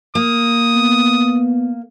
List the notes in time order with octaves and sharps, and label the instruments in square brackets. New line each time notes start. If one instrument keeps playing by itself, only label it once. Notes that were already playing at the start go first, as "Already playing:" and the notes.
[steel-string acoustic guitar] A#3 [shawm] D#6
[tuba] B3